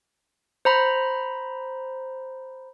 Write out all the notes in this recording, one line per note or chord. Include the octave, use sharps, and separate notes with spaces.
C5 A#5 B5